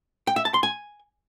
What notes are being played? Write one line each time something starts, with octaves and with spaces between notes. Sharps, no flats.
G5
E5
A5
C6
G#5